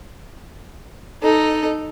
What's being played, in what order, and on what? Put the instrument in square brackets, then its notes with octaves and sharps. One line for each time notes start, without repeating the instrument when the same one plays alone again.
[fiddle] D#4 A4